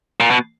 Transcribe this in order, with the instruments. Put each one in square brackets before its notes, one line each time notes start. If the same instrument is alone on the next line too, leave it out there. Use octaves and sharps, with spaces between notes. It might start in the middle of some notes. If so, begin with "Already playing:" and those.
[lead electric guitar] A#2
B2